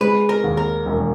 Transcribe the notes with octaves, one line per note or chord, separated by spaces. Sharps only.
G#3 B4
A#4
D#2
A#4
E1